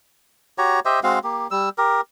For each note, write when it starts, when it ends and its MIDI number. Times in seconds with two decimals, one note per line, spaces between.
0.58 0.80 66
0.58 0.80 67
0.58 0.80 73
0.58 0.80 82
0.85 1.00 67
0.85 1.00 72
0.85 1.00 75
0.85 1.00 76
1.03 1.19 56
1.03 1.19 60
1.03 1.19 66
1.03 1.19 77
1.24 1.47 58
1.24 1.47 67
1.51 1.69 55
1.51 1.69 88
1.78 2.01 67
1.78 2.01 70